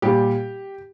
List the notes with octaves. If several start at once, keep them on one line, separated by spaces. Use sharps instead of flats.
A#2 G3 G4